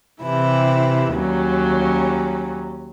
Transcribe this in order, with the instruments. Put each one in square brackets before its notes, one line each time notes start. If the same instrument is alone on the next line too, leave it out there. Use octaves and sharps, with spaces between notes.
[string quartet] C3 E3 E4 G4
D#2 F#3 G3 C#4